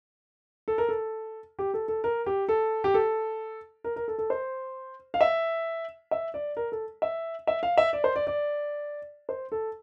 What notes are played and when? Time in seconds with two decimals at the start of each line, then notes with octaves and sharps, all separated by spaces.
0.68 A4
0.78 A#4
0.89 A4
1.59 G4
1.74 A4
1.88 A4
2.04 A#4
2.26 G4
2.49 A4
2.84 G4
2.94 A4
3.84 A#4
3.96 A#4
4.08 A4
4.18 A4
4.30 C5
5.14 F5
5.21 E5
6.11 E5
6.34 D5
6.57 A#4
6.72 A4
7.02 E5
7.47 E5
7.63 F5
7.78 E5
7.93 D5
8.04 C5
8.16 D5
8.27 D5
9.29 C5
9.52 A4